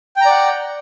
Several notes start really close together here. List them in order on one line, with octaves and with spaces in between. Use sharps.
G5 A#5 D5 F#5